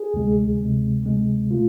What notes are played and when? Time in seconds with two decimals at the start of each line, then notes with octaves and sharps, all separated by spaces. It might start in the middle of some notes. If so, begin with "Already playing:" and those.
Already playing: G#4
0.14 D2 C3 G#3
0.59 D2 C3 G#3
1.06 D2 C3 G#3
1.51 B2 A3 F4